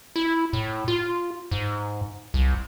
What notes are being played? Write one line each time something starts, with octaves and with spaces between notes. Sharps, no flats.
E4
A2
F4
G#2
C2